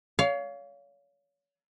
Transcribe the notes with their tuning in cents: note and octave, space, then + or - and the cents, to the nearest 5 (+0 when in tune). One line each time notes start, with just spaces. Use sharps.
C#5 +35 F5 +0